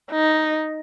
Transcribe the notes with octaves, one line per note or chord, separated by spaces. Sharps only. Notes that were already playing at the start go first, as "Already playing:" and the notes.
D#4